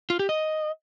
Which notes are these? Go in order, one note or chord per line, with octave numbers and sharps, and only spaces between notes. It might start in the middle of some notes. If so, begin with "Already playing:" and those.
F4
G4
D#5